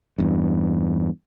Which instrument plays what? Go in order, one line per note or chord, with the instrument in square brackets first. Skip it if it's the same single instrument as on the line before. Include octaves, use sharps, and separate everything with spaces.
[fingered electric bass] E2 G2